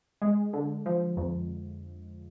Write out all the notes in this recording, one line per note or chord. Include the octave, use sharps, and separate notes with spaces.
G#3
D3
F3
F2